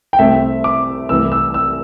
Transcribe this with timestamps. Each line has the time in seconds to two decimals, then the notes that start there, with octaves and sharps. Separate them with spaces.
0.13 G5
0.19 C2 C3 A3 C4 E5
0.64 D6
1.09 C2 C3 E3 A3 E6
1.32 E6
1.54 E6